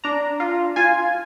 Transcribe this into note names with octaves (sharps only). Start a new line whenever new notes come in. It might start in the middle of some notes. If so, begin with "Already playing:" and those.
D4 A#5
F4
F4 G#5